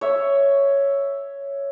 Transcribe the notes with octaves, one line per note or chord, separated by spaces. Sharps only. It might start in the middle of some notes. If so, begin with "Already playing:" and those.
C#5 E5